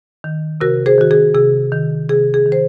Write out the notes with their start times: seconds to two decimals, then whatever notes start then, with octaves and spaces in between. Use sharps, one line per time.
0.24 D#3
0.61 C3 F#4 A#4
0.86 G#4 C5
0.98 D#3 F#4
1.11 G#4
1.35 C3 G#4
1.72 D#3
2.09 C3 G#4
2.34 G#4
2.46 D#3
2.52 C5